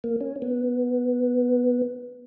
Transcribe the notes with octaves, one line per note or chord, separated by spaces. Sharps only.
A#3
C#4
B3